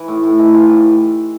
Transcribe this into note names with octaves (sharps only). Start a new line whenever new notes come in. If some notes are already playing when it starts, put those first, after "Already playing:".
Already playing: E3 E4
A2
A2
E3 D#4
E3 F4
A2 G4